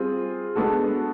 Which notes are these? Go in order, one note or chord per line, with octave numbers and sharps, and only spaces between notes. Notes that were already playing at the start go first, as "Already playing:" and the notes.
Already playing: G3 C4 F4 G#4
G#3 B3 D4 F#4 A4